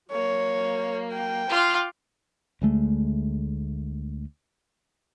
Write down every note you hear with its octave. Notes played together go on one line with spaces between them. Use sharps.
F#3 A#3 C#5
G5
F4 F5 C6 D6 F#6
D2 G#3 A3